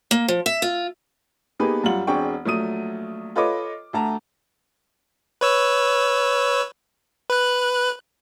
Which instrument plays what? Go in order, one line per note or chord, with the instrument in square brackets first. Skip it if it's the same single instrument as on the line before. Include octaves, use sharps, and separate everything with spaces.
[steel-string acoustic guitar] A#3
F3
E5
F4
[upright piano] A#3 B3 D#4 G4 G#4 B4
F#2 G3 F4 F#5 F#7
E1 C4 D4 G#4 G5 C#6
A#1 F#3 A3 D#6 D#7
F4 A4 B4 C#5 D#5 D6
D2 A3 A5 A#5
[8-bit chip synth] B4 C#5 E6
B4 F#6